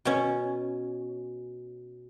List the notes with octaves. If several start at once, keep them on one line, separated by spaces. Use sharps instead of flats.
B2 C#4